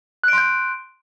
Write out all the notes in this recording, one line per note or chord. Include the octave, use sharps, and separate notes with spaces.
C6 F#6 G6 D7